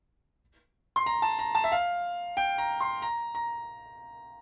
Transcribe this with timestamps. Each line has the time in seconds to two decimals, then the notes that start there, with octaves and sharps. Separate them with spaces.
0.96 C6
1.06 A#5
1.22 A5
1.39 A#5
1.55 A5
1.64 E5
1.72 F5
2.37 G5
2.58 A#5
2.81 C6
3.02 A#5
3.35 A#5